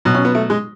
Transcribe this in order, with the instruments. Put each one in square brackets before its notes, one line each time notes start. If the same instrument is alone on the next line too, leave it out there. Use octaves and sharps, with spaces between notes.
[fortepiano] B2 F#3
C#4
B3
A3
G#3